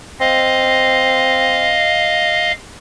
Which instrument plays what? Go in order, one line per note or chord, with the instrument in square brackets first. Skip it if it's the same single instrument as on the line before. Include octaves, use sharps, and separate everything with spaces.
[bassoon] C4 [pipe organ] D#5 F5